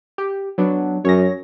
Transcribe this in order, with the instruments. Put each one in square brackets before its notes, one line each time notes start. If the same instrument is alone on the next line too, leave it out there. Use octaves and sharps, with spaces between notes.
[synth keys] G4
F#3 B3 D4
[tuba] F#2 [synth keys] C#5 A#6